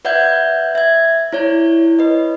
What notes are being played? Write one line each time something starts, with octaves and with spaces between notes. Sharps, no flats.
B4 D5 E5 F#5 G6 G#6
E5 G#6
E4 C#5 D5
B4 D#5